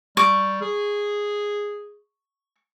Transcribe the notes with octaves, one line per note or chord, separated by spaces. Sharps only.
G3 C#6 D6
G#4